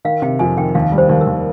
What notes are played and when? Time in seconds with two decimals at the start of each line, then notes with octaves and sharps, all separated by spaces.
0.05 D#3 F5
0.22 C3 G5
0.39 F2 G#5
0.58 D#3 G5
0.75 D#2 F5
0.92 G3
0.98 C5
1.09 D#2
1.21 A#4
1.27 D#2